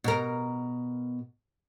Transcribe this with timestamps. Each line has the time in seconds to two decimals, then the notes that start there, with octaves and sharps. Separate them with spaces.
0.04 B2 A#4